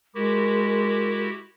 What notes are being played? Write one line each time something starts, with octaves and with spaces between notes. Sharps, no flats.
G#3 E4 F#4 G4 A#4